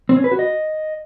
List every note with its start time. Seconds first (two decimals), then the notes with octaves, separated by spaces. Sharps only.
0.09 C4
0.17 C#4
0.24 B4
0.32 F#4
0.39 D#5